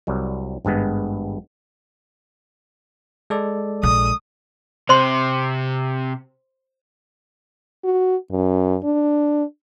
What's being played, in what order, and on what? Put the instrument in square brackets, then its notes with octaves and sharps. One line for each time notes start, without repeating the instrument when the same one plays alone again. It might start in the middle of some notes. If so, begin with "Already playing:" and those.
[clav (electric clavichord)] C2 F#3 G3
G#1 G2 G#3 B3
[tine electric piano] G#3 A4 D5
[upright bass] A#1 [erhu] D#6
[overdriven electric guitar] C3 [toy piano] C5 C6
[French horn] F#4
F#2
D4